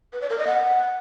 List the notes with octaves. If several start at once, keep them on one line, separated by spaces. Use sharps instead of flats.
B4
D5
A#4
D#5
F#5